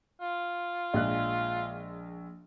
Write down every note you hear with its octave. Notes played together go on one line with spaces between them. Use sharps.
F4
A#1 G#3 F#6